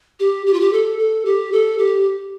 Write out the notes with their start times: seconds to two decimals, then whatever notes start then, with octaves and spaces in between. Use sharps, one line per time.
0.20 G4
0.46 G4
0.53 F4
0.60 G4
0.73 A4
0.99 A4
1.25 G4
1.52 A4
1.78 G4